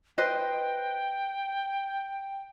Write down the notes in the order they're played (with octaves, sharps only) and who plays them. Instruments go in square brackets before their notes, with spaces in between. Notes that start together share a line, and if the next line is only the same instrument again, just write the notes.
[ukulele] B4 C5 D#5 [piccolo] G5